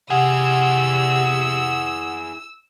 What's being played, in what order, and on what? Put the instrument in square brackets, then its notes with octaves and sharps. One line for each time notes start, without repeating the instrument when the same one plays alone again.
[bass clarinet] C3 [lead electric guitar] E4 G#4 [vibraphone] F#5 [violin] E6